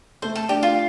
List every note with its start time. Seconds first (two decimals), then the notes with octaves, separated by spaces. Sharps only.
0.22 A3 C5
0.35 A4
0.49 D4 G4
0.63 F4